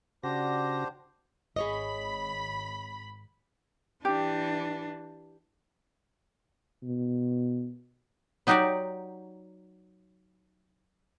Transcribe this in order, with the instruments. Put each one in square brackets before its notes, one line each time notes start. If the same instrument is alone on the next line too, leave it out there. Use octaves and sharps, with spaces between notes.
[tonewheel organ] C#3 F#4 A#6 [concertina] D4 G4 C5 [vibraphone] D5 F#5
[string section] G#1 B5 [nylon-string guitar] G#4 C#5 D#5
[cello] E3 D4 [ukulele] G4
[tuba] B2
[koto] F#3 D#4 F#4 G4 C#5 D5